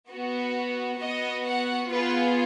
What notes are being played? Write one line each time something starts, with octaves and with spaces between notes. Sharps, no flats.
B3 F#4
B3 F#4 D#5
F#5
B3 F4 G#4 B4